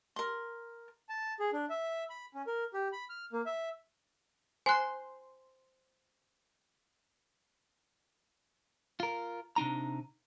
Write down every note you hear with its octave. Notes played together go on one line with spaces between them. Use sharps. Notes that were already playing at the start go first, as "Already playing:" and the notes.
A#4 C6
A5
G#4
D4
E5
B5
C#4
A#4
G4
B5
F6
A#3
E5
C5 G#5 C6 F#6
F4 A#4
C3 D4 D#4 A#5